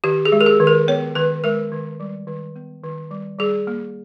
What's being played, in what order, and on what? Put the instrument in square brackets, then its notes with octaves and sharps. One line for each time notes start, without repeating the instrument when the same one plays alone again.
[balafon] D#3 G4
G#4
G#3
A#4
G#4
D#3
A#4
B3 C#5
D#3 B4
G#3 A#4
D#3
G3
D#3
B3
D#3
G3
G3 G#4
A#3